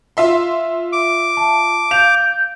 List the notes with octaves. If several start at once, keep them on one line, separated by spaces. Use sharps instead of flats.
F4 E5 C6
D6
A5
F5 G6 F7